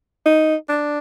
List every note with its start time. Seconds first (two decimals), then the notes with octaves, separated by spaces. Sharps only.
0.26 D#4
0.69 D4